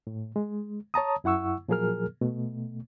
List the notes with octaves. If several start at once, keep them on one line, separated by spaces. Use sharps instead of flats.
A2
G#3
C#5 A5 A#5 D#6
F#2 E4 F#5 C#6 E6
A#2 F3 F#3 G#4 A#4 F6
B2 A3